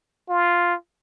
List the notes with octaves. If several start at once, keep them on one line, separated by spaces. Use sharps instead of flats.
F4